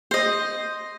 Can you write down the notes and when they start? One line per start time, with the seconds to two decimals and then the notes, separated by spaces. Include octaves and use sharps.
0.11 C5 D#5